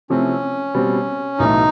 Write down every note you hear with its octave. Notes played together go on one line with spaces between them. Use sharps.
C3 F3 A3 C4 C#4 E4
B2 G3 C4
B1 A2 E3 A3 D#4